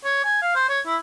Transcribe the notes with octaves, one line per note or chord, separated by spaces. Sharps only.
C#5
G#5
F5
C5
C#5
E4